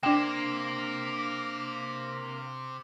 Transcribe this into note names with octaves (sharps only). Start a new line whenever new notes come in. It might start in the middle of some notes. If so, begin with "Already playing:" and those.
C3 A#3 C4 D4 G5 E7